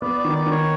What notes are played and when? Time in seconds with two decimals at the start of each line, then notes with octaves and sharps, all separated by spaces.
0.02 B3 D5
0.19 D5
0.25 D#3
0.36 D5
0.46 D#3
0.52 C#5